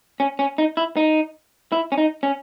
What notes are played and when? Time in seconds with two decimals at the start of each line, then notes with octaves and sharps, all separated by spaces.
0.20 C#4
0.39 C#4
0.58 D#4
0.77 E4
0.97 D#4
1.72 E4
1.92 C#4
1.98 D#4
2.23 C#4